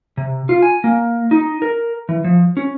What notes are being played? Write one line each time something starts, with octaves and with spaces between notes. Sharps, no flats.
C3
F4
G#5
A#3
D#4
A#4
E3
F3
C#4